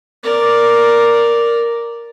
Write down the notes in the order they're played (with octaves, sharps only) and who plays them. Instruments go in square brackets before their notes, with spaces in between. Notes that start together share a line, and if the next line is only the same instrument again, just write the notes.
[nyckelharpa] A#4 D5